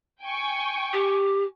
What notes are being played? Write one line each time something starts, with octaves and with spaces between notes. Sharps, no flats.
G5 G#5 C#6
G4